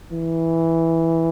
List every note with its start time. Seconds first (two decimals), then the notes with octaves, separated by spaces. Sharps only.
0.12 E3